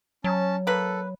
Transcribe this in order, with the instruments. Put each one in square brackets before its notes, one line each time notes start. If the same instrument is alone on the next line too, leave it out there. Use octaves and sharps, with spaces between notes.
[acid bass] F#3 [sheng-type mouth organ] C#4 A5
[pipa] A#3 B4 [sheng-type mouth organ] A4